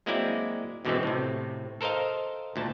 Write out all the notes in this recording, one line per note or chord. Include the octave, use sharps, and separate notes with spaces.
F#3 G#3 A#3 C4 E4 D5
F#2 B2 D3 E3 G#3 C4
A2 C3
A4 A#4 C5 D#5 F5
D2 A#2 A5